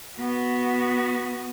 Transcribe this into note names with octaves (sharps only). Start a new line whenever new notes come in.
B3 F#4